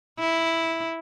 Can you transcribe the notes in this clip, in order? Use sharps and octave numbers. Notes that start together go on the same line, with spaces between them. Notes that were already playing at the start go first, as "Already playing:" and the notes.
E4